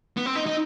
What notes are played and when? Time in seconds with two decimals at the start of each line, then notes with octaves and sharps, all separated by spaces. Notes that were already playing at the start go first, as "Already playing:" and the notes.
0.17 B3
0.26 C4
0.35 D#4
0.46 D#4